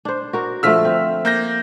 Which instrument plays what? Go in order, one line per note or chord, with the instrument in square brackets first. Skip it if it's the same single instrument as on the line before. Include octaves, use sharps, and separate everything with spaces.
[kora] D4 C5
F#4 A#4
[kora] D3 F3 A3 [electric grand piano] E6 F6 B6
[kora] C4
[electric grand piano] A#3 G6 A#6